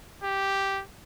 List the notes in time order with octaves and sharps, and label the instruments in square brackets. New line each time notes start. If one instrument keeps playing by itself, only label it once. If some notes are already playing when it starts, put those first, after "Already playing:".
[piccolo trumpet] G4